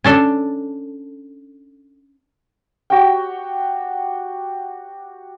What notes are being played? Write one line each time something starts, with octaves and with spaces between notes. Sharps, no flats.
C#4 D4 A4
F#4 G4 C#5 G5